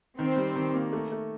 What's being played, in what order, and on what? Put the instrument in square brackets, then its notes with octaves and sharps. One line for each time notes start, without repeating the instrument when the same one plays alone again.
[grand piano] D#3 [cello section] C4
[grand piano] G3
D#3
A#3
A3
A3